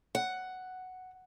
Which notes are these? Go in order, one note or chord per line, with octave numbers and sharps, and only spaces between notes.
F#5